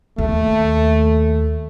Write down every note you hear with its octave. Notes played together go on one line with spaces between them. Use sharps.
D#2 A3